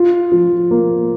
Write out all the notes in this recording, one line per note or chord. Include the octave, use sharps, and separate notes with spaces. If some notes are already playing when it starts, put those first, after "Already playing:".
Already playing: F4
F3
A#3